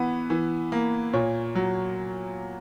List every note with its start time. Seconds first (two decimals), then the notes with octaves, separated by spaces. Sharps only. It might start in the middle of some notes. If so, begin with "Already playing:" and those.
Already playing: E3 B3
0.30 E3
0.72 A#3
1.13 A#2 C#5
1.55 F#3